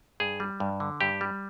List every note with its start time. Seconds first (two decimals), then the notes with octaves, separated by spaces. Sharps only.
0.20 G2 G#4
0.40 G3
0.60 G2
0.80 D3
1.01 G2 G4
1.21 G3